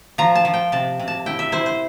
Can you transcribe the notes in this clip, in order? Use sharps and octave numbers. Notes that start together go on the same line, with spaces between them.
F3 A#5
A5
F3
G5
C3 A5
C3
A5
E4 G5
E5
E4 C5
C5